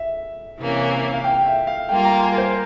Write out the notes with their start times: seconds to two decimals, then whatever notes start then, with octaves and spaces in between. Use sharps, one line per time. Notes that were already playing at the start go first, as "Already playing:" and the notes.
Already playing: E5
0.58 C3 E3 A#3 C#4
1.14 F5
1.24 G5
1.46 E5
1.67 F5
1.89 G3 A#3 F4 G5
2.05 A#5
2.23 G#5
2.32 A#4
2.38 C5